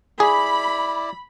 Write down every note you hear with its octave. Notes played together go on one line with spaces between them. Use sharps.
E4 G#4 D5 B5